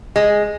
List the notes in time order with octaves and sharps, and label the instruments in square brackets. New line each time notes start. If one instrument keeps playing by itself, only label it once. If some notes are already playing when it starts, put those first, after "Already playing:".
[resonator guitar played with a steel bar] G#3